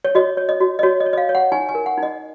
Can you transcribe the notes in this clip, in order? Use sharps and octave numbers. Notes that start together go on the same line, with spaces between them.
C#5
F#4 D#5
C#5
D#5
F#4
D#5
F#4 C#5
D#5
C#5
D#5
F5
C#5
F#5
D#4 G#5
G#5
A#4
F#5
D#4
D#5